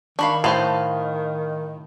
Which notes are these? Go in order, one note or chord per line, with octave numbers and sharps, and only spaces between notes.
D#3 D4 F5 B5 C#6
A2 B4 C5 F5 A5